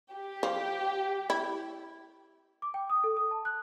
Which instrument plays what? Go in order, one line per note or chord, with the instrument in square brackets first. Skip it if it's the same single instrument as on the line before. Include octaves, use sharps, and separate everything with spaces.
[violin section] G4
[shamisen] F3
E4
[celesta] D6
G5
D#6
A4
D#6
A5
F#6